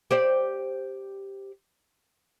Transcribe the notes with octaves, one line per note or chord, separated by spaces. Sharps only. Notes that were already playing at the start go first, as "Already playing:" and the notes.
G4 C5 D5